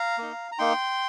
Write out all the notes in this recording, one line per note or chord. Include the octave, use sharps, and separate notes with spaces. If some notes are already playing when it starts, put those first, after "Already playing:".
Already playing: F5 A#5
A#3 D#4
A#5
A#3 D#4 G5 C6